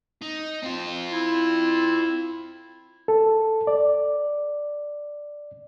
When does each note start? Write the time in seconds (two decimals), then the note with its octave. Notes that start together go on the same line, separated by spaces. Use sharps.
0.22 D#4
0.63 C4 F4
1.12 E4
3.08 A4
3.67 D5